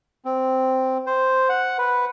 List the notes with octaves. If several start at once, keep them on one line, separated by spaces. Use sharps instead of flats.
C4
C5
F#5
B4